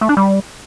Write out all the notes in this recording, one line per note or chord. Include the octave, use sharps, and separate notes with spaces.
A3
D4
G3